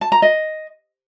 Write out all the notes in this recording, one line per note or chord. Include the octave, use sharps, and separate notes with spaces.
A5
A#5
D#5